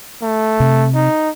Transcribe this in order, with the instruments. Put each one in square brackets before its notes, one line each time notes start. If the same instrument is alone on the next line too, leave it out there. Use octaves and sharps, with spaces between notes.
[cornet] A3
[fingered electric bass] C3
[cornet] D#4